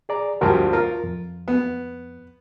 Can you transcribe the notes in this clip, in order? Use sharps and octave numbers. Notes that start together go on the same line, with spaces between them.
G#4 D5 A#5
D2 G2 F3 F#4 A#4
F4 A#4
F2
B3